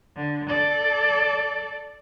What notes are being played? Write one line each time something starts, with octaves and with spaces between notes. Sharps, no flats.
D3
A4 D5